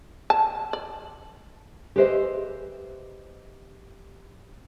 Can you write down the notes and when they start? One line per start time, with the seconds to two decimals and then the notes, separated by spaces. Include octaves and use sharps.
0.30 A5
0.73 D5
1.96 G4 G#4 B4 C5 D#5 E5